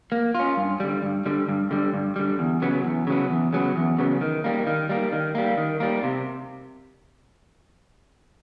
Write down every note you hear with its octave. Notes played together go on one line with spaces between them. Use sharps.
A#3
C#4 F4
G2
D3 G3
G2
D3 G3
G2
D3 G3
G2
D3 G3
E2
C#3 F#3 B3
E2
C#3 F#3 B3
E2
C#3 F#3 B3
E2
C#3 F#3 B3
D#3
G3 A#3
D#3
G3 A#3
D#3
G3 A#3
D#3
G3 A#3
C3